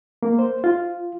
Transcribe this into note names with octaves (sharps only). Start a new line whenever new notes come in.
A#3
C5
F4